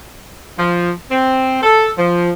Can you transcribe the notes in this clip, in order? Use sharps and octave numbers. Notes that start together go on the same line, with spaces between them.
F3
C4
A4
F3